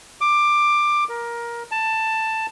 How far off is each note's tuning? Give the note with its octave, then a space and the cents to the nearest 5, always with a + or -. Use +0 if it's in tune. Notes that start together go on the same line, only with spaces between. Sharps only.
D6 +15
A#4 +15
A5 +10